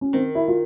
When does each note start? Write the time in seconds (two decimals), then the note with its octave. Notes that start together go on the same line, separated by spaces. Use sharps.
0.01 C#4
0.13 D#3 C4
0.35 E4
0.48 F4